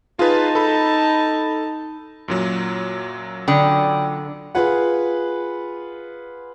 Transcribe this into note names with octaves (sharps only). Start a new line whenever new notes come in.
D#4 F4 G#4 B4 A5
A4 B5
F#2 A#2 F#3
D3 D5 G5 B5 D#6
F4 G#4 B4 F#5